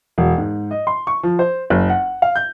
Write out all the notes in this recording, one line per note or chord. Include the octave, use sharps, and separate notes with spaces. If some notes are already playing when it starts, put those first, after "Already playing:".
E1
G#2
D#5
C6
C#6
F3
C5
F#1
F#5
F5
G6